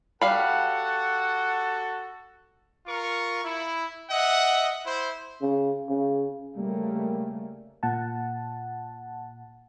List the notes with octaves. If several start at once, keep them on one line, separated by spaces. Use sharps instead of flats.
G3 F#4 A4 F5 F#5 B5
F4 A#4 C#6
E4
D#5 E5 F#5
E4 C5
C#3
C#3
C#3 G3 A3 A#3
A#2 F#5 A5